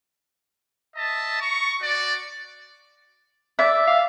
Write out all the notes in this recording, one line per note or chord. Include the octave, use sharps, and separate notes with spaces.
D#5 E5 A5
A#5 C#6
F#4 D5
D5 E5
F5